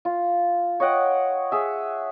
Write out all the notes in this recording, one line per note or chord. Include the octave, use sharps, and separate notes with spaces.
F4
C#5 D#5 F#5 G5
G#4 E5